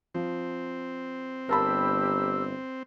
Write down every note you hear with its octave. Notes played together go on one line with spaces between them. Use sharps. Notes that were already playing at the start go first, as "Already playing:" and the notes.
F3 C4
G1 G4 A#4 A5 B5 E6